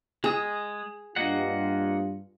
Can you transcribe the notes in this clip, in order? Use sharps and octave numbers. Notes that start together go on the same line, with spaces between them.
G#3 G#4 D#6
G2 A#3 F4 D#5 F#5